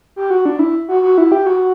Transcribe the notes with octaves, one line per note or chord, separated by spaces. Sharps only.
G4
F#4
D4
E4
F#4
F#4
E4
G4
F#4